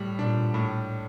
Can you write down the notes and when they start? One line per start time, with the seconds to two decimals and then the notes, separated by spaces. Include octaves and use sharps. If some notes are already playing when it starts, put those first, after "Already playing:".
Already playing: A2 G3
0.19 A#2 D4
0.54 A2